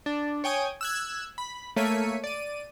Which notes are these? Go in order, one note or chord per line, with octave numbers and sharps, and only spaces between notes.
D4
C#5 G5 G#5 D#6
E6 F#6 G#6
B5
A3 A#3 C#5 B6 C#7 D#7
D5 D#7